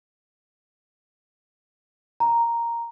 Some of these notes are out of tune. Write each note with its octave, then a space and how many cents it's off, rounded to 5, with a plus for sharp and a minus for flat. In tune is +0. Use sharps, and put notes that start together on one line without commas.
A#5 +0